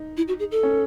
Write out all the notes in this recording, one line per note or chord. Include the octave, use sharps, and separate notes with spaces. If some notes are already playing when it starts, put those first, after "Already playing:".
Already playing: D#4
E4
F#4
G#4
A4
C#4